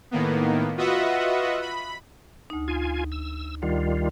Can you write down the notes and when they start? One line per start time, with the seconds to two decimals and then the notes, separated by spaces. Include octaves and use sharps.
0.11 A2 D#3 A#3 B3
0.77 F4 F#4 B4 D#5 E5 F#5
1.62 B5
2.50 D2 D#4
2.68 F4 G#5
3.12 E6
3.63 D2 D#3 G3 F4